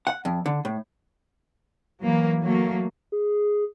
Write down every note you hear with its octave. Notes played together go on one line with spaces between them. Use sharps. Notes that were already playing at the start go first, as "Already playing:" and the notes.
F#5
F2
D3
A2
E3 F#3 A#3
F#3 A3 A#3
G#4